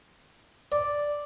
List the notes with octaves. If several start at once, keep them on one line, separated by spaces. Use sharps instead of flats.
D5